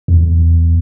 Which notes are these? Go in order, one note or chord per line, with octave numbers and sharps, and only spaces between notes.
E2